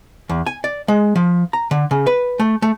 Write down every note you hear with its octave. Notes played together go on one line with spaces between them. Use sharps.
E2
G#5
D5
G#3
F3
A#5
D3
C#3
B4
A3
A3